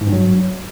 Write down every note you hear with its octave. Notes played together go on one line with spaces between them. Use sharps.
G#2
G2
F#3